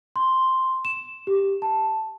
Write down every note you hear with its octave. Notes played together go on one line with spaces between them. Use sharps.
C6
E7
G4
A5